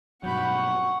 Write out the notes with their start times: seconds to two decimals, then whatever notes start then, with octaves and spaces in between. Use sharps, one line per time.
0.23 G2 B2 F#3 F#5 B5 C#6 G6
0.55 C#6